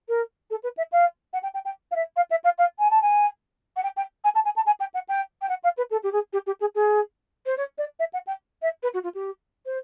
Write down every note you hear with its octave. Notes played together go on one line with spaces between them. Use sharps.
A#4
A4
B4
E5
F5
F#5
G5
G5
G5
F5
E5
F5
E5
F5
F5
G#5
A5
G#5
F#5
G5
G5
G#5
A5
G#5
A5
G#5
G5
F#5
G5
G5
F#5
F5
B4
A4
G4
G#4
G4
G4
G#4
G#4
C5
C#5
D5
E5
F#5
G5
E5
B4
F#4
F4
G4
C5